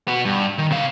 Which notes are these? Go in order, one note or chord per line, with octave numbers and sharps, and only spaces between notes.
B3 F#4
G2
D#3
C3 F5